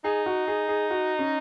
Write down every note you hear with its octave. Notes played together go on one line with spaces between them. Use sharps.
D#4 G#4
F#4
G#4
G#4
F#4
C#4